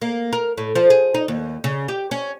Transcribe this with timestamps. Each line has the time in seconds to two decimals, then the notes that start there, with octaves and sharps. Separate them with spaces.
0.01 A#3
0.33 A#4
0.58 A2
0.75 F3
0.90 G#4
1.14 D#4
1.28 D#2
1.64 C#3
1.88 G4
2.11 C#4